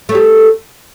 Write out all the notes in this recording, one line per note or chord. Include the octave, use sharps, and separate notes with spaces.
A3 G4 C#5